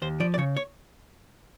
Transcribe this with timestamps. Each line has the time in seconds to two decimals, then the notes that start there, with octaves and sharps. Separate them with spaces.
0.02 D#2 C5
0.20 F3 D5
0.34 D5
0.38 C#3 C#5
0.57 C#5